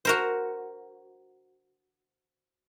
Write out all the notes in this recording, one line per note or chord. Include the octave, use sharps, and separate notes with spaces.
F#4 A#4 C5